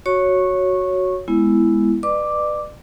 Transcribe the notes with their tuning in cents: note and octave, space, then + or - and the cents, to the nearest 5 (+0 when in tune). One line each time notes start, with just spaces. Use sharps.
F#4 +0 C#5 +0 C#6 -15
G#3 +0 B3 +0 E4 +0
B4 +0 D5 +35 D6 +0